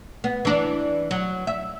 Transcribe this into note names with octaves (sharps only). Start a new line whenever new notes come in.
B3
E3 D4
F#3
E5